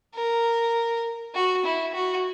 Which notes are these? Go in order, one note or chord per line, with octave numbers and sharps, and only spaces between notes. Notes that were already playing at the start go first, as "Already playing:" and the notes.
A#4
F#4
E4
F#4